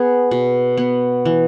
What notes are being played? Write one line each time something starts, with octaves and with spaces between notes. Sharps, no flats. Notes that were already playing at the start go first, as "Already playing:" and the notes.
Already playing: B3 G#4
B2
B3
E3